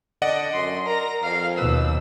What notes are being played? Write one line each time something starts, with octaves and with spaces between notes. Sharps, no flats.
D3 D5 D#5 F#5
F#2 C6
A#4 A#5
F2 F5
D#2 B2 B4 E6